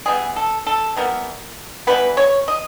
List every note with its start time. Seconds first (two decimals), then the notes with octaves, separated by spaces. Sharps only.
0.06 E3 G3 B3 G#4
0.36 A4
0.67 A4
0.96 E3 G3 B3 A#4
1.87 E3 G3 B3 B4
2.17 C#5
2.48 D#5